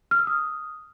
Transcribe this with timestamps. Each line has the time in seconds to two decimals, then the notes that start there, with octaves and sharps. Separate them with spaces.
0.11 F6
0.19 E6
0.27 D#6